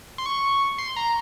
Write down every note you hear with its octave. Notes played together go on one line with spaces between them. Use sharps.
C6
C#6
C6
A#5